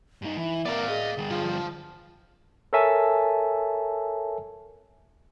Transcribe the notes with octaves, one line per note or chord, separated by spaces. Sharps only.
G2 D#4
E3 E5
B3 A#4 D5 F5
G#4 D#5
D3 G3
F3 F4
A4 A#4 C#5 E5 G#5 A5